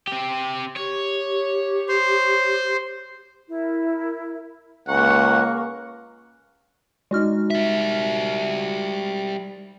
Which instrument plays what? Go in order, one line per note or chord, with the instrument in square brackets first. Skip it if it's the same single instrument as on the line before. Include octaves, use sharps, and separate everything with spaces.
[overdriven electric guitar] C4 G4
[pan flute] G4 [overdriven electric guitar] C#5
[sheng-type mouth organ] C5 C6
[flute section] E4 A#4
[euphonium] C#2 [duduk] A#3 [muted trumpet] F#5 [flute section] A#5 C#6
[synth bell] G#3 F#4 F6 [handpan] D#4 D5
[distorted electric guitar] G3 E5